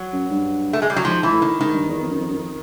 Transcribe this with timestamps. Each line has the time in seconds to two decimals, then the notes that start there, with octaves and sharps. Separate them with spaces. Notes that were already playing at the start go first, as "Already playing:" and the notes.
Already playing: F#3
0.13 F#2
0.31 G2
0.73 A3
0.82 G#3
0.90 G3
0.96 F#3
1.05 G#2 F3
1.23 E3
1.32 A2
1.42 D#3
1.60 G#2 D#3
1.74 G2
1.89 E2
2.02 F2
2.10 F#2
2.19 F2
2.29 F#2
2.38 F2